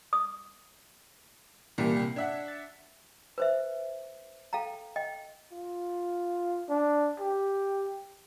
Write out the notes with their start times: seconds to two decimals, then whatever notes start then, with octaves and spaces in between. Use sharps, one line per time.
0.13 D#6
1.78 C2 A#2 E3 G3 A#3 G4
1.97 C3 G5
2.16 D4 E5 F#5 G#6
2.48 A6
3.38 B4 C5 E5
4.53 A4 F5 G5 A#5
4.96 D#5 G5
5.52 F4
6.69 D4
7.20 G4